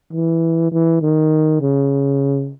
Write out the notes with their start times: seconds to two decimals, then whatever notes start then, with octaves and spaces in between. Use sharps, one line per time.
0.13 E3
0.72 E3
1.02 D#3
1.61 C#3